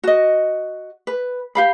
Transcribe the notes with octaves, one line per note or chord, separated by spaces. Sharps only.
F#4 D#5
B4
G4 F5 B5